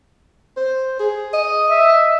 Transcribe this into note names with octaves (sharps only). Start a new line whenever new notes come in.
C5
G#4
D#5
E5